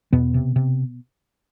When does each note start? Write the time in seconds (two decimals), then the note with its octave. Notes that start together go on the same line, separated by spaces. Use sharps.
0.13 E2 B2 B3
0.34 C3
0.56 C3